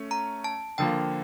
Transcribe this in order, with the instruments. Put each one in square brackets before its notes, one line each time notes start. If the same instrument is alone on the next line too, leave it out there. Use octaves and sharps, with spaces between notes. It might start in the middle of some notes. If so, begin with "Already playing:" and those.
Already playing: [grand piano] A3 C#4
[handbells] A#5
A5
[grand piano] D3 F3 A#3 [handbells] G5